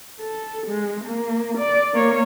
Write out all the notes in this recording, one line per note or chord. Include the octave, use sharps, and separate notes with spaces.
A4
G#3
A#3
D5
A#3 C#5